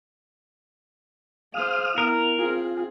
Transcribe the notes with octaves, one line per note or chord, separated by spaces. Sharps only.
G#4 C5 F5 D#6 F6
B3 E4 A#4
C4 F4 G#4